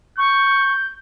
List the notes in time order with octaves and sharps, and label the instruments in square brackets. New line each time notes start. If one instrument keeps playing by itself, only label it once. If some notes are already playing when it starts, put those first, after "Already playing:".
[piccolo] C#6 [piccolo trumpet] G6